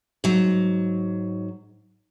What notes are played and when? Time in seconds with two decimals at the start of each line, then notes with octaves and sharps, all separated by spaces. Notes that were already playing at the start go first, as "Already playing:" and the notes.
0.24 G#2 F#3